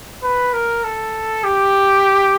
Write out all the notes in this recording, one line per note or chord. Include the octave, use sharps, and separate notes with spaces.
B4
A#4
A4
G4